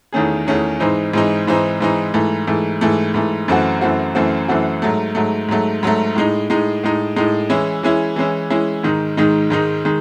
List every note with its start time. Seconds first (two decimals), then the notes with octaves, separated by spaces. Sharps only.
0.13 E2 D#3 A3 C#4 G#4
0.47 E2 D#3 A3 C#4 G#4
0.80 G#2 E3 C4 D#4
1.13 G#2 E3 C4 D#4
1.47 G#2 E3 C4 D#4
1.81 G#2 E3 C4 D#4
2.14 G#2 E3 A3
2.47 G#2 E3 A3
2.81 G#2 E3 A3
3.14 G#2 E3 A3
3.48 F#2 E3 A3 C4 F#4
3.81 F#2 E3 A3 C4 F#4
4.15 F#2 E3 A3 C4 F#4
4.48 F#2 E3 A3 C4 F#4
4.82 G#2 F#3 A3
5.15 G#2 F#3 A3
5.49 G#2 F#3 A3
5.83 G#2 F#3 A3
6.15 A2 G#3 D#4
6.50 A2 G#3 D#4
6.83 A2 G#3 D#4
7.16 A2 G#3 D#4
7.49 E3 G#3 C#4 E4
7.83 E3 G#3 C#4 E4
8.16 E3 G#3 C#4 E4
8.50 E3 G#3 C#4 E4
8.83 G#2 D#3 G#3 D#4
9.17 G#2 D#3 G#3 D#4
9.50 G#2 D#3 G#3 D#4
9.85 D#3 G#3